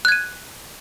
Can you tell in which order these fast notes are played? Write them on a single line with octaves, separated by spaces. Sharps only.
F#6 G#6 D#7